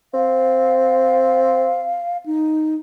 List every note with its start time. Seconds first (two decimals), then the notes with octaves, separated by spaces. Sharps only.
0.14 C4 F5
2.26 D#4